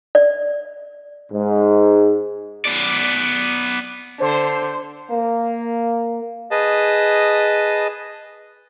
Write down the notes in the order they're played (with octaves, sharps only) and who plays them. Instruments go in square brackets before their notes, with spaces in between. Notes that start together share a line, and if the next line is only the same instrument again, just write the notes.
[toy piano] D5
[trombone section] G#2
[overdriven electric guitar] B3 D5
[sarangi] D3 [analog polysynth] C5
[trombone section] A#3
[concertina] G#4 B4 D#5 A5 D#6